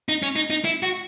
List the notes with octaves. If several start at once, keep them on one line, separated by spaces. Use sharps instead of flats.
D#4
C#4
D#4
D#4
E4
F#4